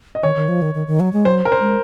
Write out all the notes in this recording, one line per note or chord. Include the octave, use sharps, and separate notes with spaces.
D#5
D#3 C#5
D#3
F3
D#3
D#3
D#3
F#3
G#3
F#3 C5
A#4
C5
G#3